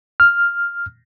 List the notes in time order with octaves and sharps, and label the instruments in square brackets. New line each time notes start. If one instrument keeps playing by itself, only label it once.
[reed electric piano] F6